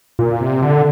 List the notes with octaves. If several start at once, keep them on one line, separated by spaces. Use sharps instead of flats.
A#2
C3
D3